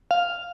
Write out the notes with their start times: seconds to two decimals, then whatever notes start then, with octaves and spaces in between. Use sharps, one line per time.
0.11 F5